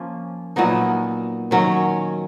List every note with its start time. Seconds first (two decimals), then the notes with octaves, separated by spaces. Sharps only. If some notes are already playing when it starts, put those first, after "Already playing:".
Already playing: F3 A#3 C#4
0.56 A#2 F#3 B3 D#4
1.51 D#3 F#3 C#4